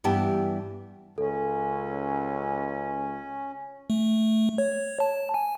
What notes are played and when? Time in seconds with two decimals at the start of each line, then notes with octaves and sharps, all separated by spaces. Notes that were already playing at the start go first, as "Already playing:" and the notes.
0.04 G2 E3 B3 G4 A5
1.18 C#2 C#4 A4
3.90 A3
4.58 C#5
5.00 A5
5.34 G#5